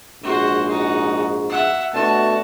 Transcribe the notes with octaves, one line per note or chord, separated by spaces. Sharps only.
A#1 G#2 F#4 C5
D#4 F#4
E5 F#5
B2 A3 D4 F#4 A5